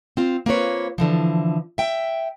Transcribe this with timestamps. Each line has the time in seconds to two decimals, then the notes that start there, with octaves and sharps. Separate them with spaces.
0.17 C4 F4
0.46 A#3 C4 F4 B4 C#5
0.98 D3 E3 F3
1.78 E5 G5